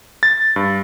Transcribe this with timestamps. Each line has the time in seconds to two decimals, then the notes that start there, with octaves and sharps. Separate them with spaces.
0.23 A6
0.56 G2